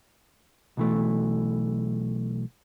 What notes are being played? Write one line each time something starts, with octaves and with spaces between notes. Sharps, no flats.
B1 E3 A3